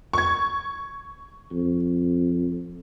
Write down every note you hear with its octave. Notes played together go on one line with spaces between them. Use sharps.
C#6 G#6
F2